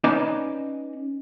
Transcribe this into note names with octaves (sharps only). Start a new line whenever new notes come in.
C#4 D#4 B4 D5 D#5 G#5